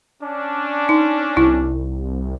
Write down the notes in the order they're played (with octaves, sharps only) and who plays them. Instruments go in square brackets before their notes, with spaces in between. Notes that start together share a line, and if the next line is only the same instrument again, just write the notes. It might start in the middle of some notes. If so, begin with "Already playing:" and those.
[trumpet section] C#4 D4
[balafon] D#4
[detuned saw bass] C2 [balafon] E4